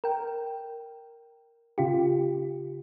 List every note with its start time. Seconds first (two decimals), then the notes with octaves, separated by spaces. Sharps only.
0.04 A#4 G5
1.78 C#3 F4 G4